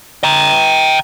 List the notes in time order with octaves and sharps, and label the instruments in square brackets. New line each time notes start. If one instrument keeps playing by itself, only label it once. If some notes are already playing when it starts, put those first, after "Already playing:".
[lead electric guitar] G5 A#5